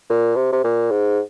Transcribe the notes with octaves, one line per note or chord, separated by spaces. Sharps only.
A#2
C3
C3
A#2
G#2